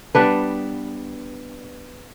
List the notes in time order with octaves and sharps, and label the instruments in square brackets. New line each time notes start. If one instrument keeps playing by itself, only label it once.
[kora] G3 B3 D4 B4